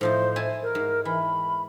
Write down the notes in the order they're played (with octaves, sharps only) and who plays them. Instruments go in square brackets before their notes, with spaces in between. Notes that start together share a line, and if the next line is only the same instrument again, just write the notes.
[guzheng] A2 F3 D#4 [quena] C5
[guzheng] E4 G#5 A5
[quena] A#4
[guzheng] G#2
[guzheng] E3 [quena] B5